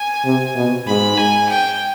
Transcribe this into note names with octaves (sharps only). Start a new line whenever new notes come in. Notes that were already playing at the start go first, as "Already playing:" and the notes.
Already playing: G#5
C3
B2
G#2 B5
G#5
G5